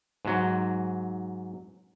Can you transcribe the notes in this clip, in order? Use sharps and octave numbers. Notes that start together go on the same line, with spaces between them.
G#2 F#3